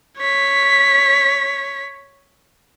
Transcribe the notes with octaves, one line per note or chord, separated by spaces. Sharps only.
C#5 B6